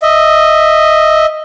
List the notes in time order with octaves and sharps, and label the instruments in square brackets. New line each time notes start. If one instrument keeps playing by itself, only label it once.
[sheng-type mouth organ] D#5 E5